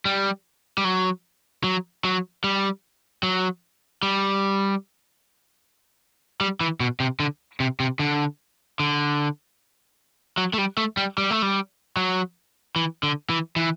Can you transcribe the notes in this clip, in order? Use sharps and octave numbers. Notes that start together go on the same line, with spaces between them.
G3
G3
F#3
F#3
F#3
G3
F#3
G3
G3
E3
B2
C3
D3
C3
C3
D3
D3
F#3
A3
G3
A3
G3
G3
A3
G3
F#3
E3
D3
E3
E3